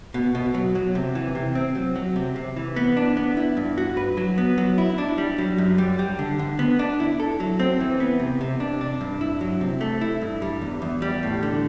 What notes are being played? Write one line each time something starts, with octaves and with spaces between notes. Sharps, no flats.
B2
B2
F#3
F#3
C3
E3
C3
C4
F#3
F#3
C3
C3
E3
B3
D4
B3
E4
G2
F#4
B4
F#3
B3
F#3
E4
D4
G3
F#3
F#2
G3
G3
D3
D3
B3
D4
E4
A4
F#3
C4
E3
B3
C3
C3
D4
D4
G2
E4
F#3
C3
A3
E4
G2
G3
E2
E2
G3
A2
D3